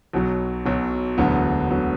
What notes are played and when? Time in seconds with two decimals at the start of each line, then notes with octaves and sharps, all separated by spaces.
0.13 B1 B2 F#3
0.65 B1 B2 F#3
1.18 E1 D2 D3 F#3 B3
1.71 D3 F#3 B3